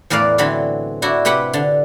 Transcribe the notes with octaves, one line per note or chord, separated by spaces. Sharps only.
E2 A2 A#4 B4 D5 F5
D3 E3 F#3 C4 B5
D4 E4 F#4
C3 G4 B4 F#5 G5
D3